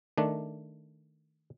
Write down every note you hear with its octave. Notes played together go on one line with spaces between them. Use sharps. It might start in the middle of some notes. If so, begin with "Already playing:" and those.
D#3 A3 D4